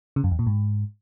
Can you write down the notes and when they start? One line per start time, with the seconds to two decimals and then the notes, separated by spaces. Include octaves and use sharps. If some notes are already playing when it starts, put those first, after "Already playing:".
0.16 C#3
0.24 F#2
0.31 E2
0.39 A#2
0.47 G#2